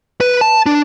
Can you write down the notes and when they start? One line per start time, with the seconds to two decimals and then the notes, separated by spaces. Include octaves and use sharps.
0.21 B4
0.41 A5
0.66 D4